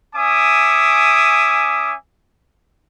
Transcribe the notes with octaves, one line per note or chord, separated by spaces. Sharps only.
C#4 E5 G#5 D6 D#6